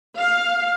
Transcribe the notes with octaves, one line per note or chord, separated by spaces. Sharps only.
F5